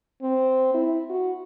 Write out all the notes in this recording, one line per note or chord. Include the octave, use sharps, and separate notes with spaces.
C4
E4
F#4